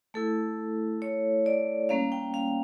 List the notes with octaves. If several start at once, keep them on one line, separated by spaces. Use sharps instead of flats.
A3 E4 A4
C#5
D5
G3 A#3 C#4 F5
G5
F5